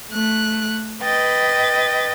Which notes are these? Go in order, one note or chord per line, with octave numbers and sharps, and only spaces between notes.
A3 F#6
B4 D#5 G5 A6